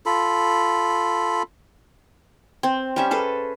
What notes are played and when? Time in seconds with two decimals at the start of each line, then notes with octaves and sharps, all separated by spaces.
0.06 F4 A4 B5
2.63 C4
2.96 G3 C#4 E5
3.11 G#4 A4 B4